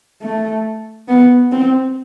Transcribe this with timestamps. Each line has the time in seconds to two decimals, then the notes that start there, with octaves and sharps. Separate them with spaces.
0.22 A3
1.08 B3
1.52 C4